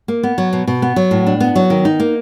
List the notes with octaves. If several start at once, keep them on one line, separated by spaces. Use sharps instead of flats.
A#3
B3
F#3
B2
B2
B3
F#3
A2
D4
B3
F#3
D#3
D#4
A#3